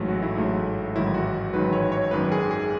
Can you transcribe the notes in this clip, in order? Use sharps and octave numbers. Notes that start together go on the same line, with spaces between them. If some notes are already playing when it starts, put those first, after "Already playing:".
Already playing: A1 G#2 F#3 A3
F#4
E4
A1 G#2 F#3 A3
A1 G#2 D#3 F#3 E4
F#4
A1 G#2 D#3 F#3 B4
C#5
C#5
G#1 F#2 D#3 B4
G#4
G#4